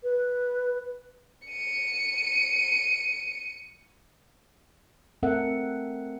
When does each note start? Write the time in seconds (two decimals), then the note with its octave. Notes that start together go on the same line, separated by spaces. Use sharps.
0.03 B4
1.48 C#7 D#7
5.23 A3 C4 A4 A#4 E5 F#5